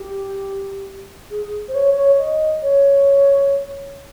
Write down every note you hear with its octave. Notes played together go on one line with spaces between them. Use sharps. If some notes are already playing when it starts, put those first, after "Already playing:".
Already playing: G4
G#4
C5
C#5
C#5
D#5
C#5